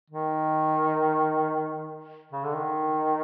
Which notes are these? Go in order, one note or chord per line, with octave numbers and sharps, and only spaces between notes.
D#3
C#3
D3
D#3